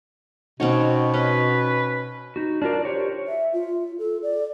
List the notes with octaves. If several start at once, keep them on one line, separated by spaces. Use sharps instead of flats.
B2 C4 C#4 D#4 F#4 C#5
C#4 B4
D#4 F#4
D4 F4 F#4 A#4 D5
G4 C5 C#5
E5
F4
A4
D5